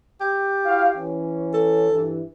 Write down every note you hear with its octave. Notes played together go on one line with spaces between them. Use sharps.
G4
E4 F#4 F5
E3 C#4
A4
G2 E3